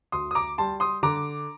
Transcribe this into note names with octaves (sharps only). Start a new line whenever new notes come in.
D2 C6 D#6
D#6
A#5 D6
G3 A5 C6
C6 D#6
D3 A#5 D6